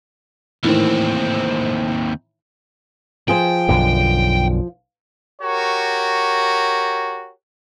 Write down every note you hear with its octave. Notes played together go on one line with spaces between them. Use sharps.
D#2 A2 D#3 E3 C4
F3 G#4 C5 G5
B1 F#2 D3
F#4 G4 A#4 C#5